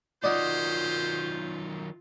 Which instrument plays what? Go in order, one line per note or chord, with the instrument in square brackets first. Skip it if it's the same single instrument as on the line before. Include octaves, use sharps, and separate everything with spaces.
[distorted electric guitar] D#3 F#3 [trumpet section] C#4 C5 [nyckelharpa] F4 [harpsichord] D5 D#5 F#5